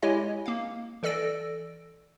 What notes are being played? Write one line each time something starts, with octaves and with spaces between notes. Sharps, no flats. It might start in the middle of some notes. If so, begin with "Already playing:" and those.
G#3 E4 G4 C#5 D#5 G#5
A#3 F5
E3 A4 D5 E6 A#6 D7